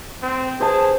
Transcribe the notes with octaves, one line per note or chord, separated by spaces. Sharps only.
C4
G#4 C5 A5